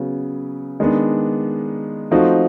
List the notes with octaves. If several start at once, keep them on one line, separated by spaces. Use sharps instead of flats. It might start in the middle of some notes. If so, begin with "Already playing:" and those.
Already playing: C#3 F#3 B3
D#3 G#3 B3 D4
F3 A3 C4 D#4 F#4